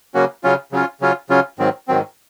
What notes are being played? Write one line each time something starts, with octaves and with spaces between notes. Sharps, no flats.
C#3 F#3 A#3 C#4 F#4
C#3 F#3 C#4 F4
C#3 F#3 C#4 F4
C#3 F#3 C#4 F4
C#3 F#3 C#4 F4
G#2 D#3 F#3 C4
G#2 D#3 F#3 C4